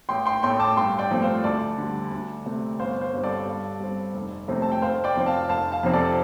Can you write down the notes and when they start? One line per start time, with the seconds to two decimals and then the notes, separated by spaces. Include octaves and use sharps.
0.09 A1 G5 C6
0.26 G5 C6
0.43 A2 A3 G5 C6
0.59 A5 D6
0.77 G2 G5 C6
0.99 D5 G5
1.11 F3 A3 C4
1.22 C5 F5
1.44 D2 A4 D5
1.78 D3 G3
2.11 D2
2.46 C3 A3
2.79 G1 C5 F5
3.01 C5
3.13 G2 G3 C4
3.24 A4 D5
3.46 G2
3.80 G3 C4
4.13 F1
4.48 F2 C3 A3 C4
4.62 A5
4.72 G5
4.82 F1 C5 F5
5.04 D5 G5
5.15 F2 F3 C4
5.26 F5 A5
5.49 F1 F5 A5
5.72 F5 A5
5.83 F2 C3 F3 C4
5.93 A4 D5